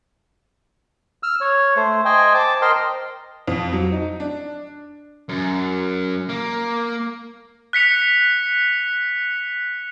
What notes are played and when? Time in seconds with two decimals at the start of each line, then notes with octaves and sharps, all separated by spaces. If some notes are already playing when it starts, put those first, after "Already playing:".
1.23 E6 F6
1.41 C#5
1.76 A3 C5
2.05 C5 D#5 G5 G#5
2.34 A5 D6
2.62 A#4 C5 D#5 G5 C6
3.48 F2
3.73 F#3
3.92 D#4
4.20 D4
5.29 F#2
6.29 A#3
7.73 F#6 B6 C#7 F7